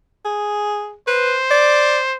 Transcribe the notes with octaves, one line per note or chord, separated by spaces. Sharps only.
G#4
B4 C5
D5